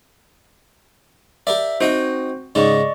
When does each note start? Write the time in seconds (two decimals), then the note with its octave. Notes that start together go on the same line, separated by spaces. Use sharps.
1.47 G4 A#4 D5 E5
1.81 C4 D#4 F#4 C5 D#5 G5
2.55 G#2 C#3 D#4 D5 D#5 C#6